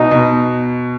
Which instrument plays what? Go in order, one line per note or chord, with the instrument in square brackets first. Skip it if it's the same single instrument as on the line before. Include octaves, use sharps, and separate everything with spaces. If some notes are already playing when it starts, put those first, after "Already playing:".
Already playing: [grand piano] B2 [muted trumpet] D#4
[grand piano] B2